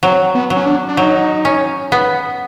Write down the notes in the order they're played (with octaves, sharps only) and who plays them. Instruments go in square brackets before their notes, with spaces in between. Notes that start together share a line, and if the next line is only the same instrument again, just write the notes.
[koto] F#3 [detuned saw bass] C4
[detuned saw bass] B3
[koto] F#3
[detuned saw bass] C#4
D4
D4
[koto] F#3 [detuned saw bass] D#4
[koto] C#4
B3